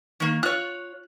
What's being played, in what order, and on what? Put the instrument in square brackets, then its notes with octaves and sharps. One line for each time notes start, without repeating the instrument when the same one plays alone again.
[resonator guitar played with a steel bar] D#3 A#3
[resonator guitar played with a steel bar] F4 C#5 [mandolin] F#6